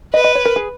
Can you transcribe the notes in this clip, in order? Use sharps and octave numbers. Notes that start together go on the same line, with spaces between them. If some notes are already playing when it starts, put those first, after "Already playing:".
B4 D#5
D#5
C#5
A#4
G#4